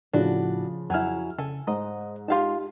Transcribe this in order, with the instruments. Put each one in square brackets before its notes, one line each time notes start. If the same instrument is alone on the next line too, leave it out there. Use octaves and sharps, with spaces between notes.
[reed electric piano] A2 E4 [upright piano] C#3 F3 [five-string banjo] D4 F#4
[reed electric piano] F2 G#5 F6 [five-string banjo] F#3 E4
[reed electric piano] C#3 [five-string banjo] A4 G#5
[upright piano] G#2 [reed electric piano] C5 D#5 A#5
[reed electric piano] D#4 G4 [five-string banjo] F4 F5 A5